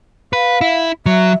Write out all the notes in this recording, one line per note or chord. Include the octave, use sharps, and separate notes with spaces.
B4 F5
E4
F#3 E5